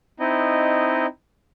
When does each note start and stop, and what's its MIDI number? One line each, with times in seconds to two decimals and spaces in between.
0.20 1.06 60
0.20 1.06 63
0.20 1.06 64
0.20 1.06 75